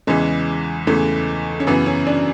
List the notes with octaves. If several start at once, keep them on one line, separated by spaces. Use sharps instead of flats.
E2 C#3 E3 G#3
E2 C#3 E3 A3
C#4
F#2 C#3 E3 B3
C#4
D4